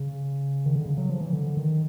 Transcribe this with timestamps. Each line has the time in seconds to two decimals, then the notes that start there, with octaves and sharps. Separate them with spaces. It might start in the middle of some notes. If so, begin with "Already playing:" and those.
Already playing: C#3
0.66 D#3
0.76 D3
0.86 C#3
0.97 F#3
1.10 F3
1.21 E3
1.33 D3
1.57 D#3